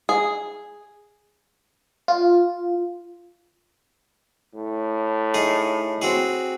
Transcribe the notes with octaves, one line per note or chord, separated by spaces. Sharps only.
G#4
F4
A2
D#4 G#4
C4 F#4 G#4